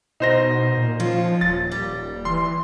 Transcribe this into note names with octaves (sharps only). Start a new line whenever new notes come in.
B2 D#4 C5 A#6
A#2
F3 C#4 F4
D#1 A6
G3
E3 C6